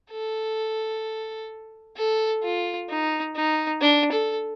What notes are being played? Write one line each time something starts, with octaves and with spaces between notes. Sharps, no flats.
A4
A4
F4
D#4
D#4
D4
A4